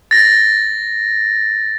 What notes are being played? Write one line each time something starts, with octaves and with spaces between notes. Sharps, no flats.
A6 A#6